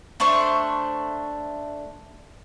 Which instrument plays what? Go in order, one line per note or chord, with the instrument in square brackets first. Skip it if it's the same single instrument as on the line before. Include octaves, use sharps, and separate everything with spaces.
[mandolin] A3 D4 C5 C#6